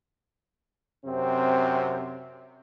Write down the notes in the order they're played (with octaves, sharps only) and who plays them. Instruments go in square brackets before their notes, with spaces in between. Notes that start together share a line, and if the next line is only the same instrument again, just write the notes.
[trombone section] F#2 C3 C4